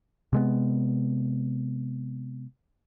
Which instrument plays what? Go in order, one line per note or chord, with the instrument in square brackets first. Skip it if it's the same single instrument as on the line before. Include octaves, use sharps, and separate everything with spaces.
[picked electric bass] C3 G#3 B3